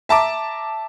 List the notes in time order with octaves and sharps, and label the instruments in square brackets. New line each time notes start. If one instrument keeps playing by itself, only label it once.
[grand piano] E5 A5 A#5 D6